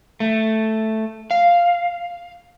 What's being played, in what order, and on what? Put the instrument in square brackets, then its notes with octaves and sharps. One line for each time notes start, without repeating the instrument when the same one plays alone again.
[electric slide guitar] A3
F5